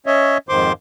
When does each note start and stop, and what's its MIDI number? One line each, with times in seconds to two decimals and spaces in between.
0.06 0.38 61
0.06 0.38 73
0.06 0.38 75
0.06 0.38 76
0.49 0.72 41
0.49 0.72 44
0.49 0.72 51
0.49 0.72 72
0.49 0.72 84
0.49 0.72 86